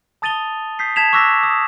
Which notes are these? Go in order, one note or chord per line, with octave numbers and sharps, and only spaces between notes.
A5 D#6 A6 D#7 F7 G7
D#6 G6 B6 C7
A5 G#6 B6 E7 F7
C#6 D6 E6 F#6 A#6 B6
D#6